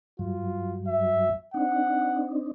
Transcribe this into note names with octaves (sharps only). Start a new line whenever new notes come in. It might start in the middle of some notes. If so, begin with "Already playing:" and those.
G2 F#3 F4
E5
C4 D4 D#4 F#5